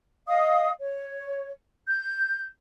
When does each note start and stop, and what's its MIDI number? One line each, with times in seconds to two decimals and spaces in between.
0.27 0.68 75
0.27 0.68 77
0.27 0.68 87
0.80 1.48 73
1.87 2.45 91